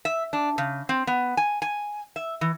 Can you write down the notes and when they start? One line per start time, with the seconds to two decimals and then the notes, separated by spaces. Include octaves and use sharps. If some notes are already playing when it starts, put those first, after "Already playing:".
0.05 E5
0.33 D4
0.58 C#3
0.89 C4
1.07 B3
1.37 G#5
1.62 G#5
2.16 E5
2.41 E3